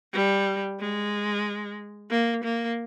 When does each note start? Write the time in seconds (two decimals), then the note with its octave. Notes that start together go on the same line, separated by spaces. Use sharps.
0.13 G3
0.80 G#3
2.11 A#3
2.44 A#3